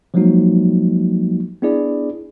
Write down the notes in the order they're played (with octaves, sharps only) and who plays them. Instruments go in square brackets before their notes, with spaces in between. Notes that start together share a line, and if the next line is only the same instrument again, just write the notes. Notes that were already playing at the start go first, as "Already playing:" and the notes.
[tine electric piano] F3 F#3 G#3 A#3 D#4 F#4
B3 D4 E4 G#4 D5